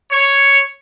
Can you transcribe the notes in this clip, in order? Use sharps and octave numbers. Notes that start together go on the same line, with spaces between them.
C#5